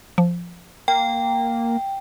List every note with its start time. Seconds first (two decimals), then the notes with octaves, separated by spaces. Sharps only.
0.18 F3
0.88 A#3 G5